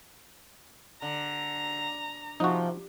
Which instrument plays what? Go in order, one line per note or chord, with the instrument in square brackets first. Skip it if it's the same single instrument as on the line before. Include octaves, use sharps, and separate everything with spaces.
[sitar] D3 [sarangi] A#5
[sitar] C3 [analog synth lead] F3 [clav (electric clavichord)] D#4 F#4